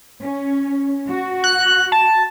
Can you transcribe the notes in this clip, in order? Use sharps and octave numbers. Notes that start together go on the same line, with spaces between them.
C#4
F#4
F#6
A5